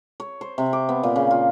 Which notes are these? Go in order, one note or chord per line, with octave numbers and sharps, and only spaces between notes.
C#5
C5
C3
D6
B3
A#2
C#3
F4